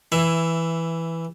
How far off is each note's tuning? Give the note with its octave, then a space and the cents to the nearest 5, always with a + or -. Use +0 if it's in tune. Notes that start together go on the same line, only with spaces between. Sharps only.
E3 +0 E5 +15